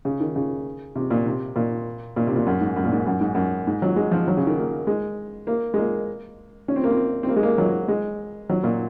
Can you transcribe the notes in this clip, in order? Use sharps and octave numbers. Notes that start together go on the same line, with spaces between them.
C#3
D#3
C#3
C3
A#2
C3
A#2
A#2
C3
A#2
F#2
G#2
F#2
A#2
G#2
F#2
G#2
F#2
G#2
F#3
G#3
F3
F#3
C#3
D#3
A#3
G#3
A#3
G#3
A#3
C#4
C4
A#3
C4
C4
A#3
G#3
A#3
F#3
G#3
F#3
A#2